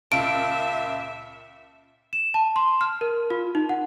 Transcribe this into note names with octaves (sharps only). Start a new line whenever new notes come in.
C#2 A#2 C#3 E5 F5 A5 D7
E7
A5
C6
F6
A#4
F4
D#4
F#5